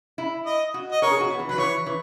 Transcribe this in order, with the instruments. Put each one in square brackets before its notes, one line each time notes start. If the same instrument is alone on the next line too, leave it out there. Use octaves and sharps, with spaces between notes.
[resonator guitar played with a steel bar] E4
[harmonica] D#5
[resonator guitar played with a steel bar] F#4
[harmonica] D#5
[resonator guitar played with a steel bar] A#4 [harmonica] C#5
[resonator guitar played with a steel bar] G#4
F#4
B3
E3
[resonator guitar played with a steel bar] F#3 [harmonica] B4
[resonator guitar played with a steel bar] E3 [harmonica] C#5
[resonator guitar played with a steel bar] E3